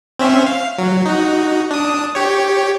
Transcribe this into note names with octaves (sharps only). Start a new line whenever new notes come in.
C4 C#4 E5
F5
F#3
D#4 F#4
D4 D#6
G4 C#5